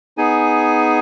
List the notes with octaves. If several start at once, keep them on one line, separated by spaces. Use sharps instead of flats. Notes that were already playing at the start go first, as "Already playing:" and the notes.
B3 D#4 G#4 G#5